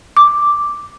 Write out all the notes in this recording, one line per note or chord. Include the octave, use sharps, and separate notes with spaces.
D6